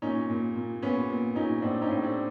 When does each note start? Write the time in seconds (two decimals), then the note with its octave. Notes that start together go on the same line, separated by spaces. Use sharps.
0.02 A#2 C#4 D#4
0.30 A#2
0.56 A#2
0.82 A#2 B3 C#4
1.10 A#2
1.35 A#2 C#4 D#4
1.62 A2 C4 D4
1.82 C#4 D#4
1.89 A2
2.02 C4 D4